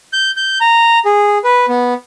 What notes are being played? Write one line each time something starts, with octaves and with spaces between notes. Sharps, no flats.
G6
G6
A#5
G#4
B4
B3